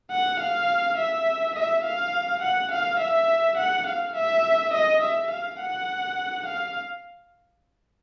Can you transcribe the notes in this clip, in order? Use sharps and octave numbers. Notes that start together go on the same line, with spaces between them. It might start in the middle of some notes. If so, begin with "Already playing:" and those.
F#5
F5
E5
E5
F5
F#5
F5
E5
F#5
F5
E5
D#5
E5
F5
F#5
F5